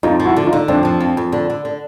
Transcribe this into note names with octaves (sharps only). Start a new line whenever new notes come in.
F2 D#4 F4
F3
E4 F#4
D3
D#4 F4
D3
F2 C4 D4
F3
F2
F2
D3
D3
D3